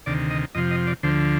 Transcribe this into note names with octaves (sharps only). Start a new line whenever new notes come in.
D2 C3 D#3 D5
D#5
F2 C3 F3 D#5
D#5
D5
D2 D3 F3 C5